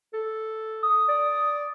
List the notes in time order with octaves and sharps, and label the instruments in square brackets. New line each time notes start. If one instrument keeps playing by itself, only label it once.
[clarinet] A4
[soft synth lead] D#6
[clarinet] D5